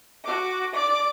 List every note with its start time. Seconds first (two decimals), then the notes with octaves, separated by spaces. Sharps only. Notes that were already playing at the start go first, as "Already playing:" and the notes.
0.24 F#4 D6
0.73 D5 D6